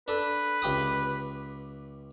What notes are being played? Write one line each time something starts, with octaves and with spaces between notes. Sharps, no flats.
D4 A4 B4
C#2 G4 D#6